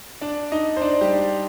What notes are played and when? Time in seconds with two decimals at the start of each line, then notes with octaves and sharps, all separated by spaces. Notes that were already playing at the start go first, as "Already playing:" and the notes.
0.21 D4 D5
0.52 D#4 D#5
0.76 C5
0.82 D4 D5
1.01 G3 G4